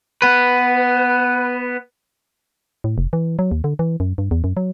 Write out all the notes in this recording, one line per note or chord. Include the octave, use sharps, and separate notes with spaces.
B3 B4
A2
F1
E3
F#3
D#2
D3
E3
F#2
G2
E2
F#2
F#3